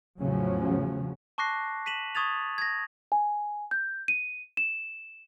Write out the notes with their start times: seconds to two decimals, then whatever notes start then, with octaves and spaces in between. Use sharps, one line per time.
0.19 E2 A2 C#3 F3 F#3 C#4
1.38 A5 C#6 D6 F#6 A#6 C7
1.86 B6 D#7 E7 F#7
2.15 C#6 D#6 G#6 A6 F7
2.58 G#6 A#6
3.12 G#5
3.71 G6
4.08 D#7
4.57 E7